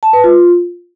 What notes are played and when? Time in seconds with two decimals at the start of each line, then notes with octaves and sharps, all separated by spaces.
0.03 A5
0.13 B4
0.24 F4